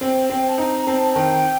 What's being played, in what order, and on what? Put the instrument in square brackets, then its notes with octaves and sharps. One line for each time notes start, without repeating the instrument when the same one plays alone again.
[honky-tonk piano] C4 [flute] G5
[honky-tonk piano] C4 [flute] G5
[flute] A5
[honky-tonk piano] D#4 [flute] A#5
[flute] A#5
[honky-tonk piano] C4 [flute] A5
[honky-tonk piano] D#3 [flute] G5